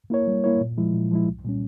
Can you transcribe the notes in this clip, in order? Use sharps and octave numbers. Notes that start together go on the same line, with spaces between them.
A#3 E4 A#4 C#5
G3
A#3 E4 A#4 C#5
A#2
F3 G#3 E4
A#2
F3 G#3 E4
C2
A#2 G3 C#4